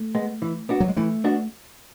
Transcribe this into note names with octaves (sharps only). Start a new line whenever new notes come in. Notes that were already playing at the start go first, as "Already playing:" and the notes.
Already playing: A3
G#3 B3
E3
B3 D4 F#4
F#3
G#3
E3 A3
B3 D4 F#4